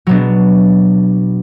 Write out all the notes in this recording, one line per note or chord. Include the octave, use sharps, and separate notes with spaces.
B2 F#3 B3 D4